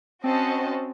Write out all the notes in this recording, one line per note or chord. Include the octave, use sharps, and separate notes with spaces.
C4 C#4 F#4 C5 D#5 A5